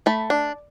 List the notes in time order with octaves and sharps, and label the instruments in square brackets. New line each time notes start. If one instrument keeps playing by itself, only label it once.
[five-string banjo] A3 A5 B5
D4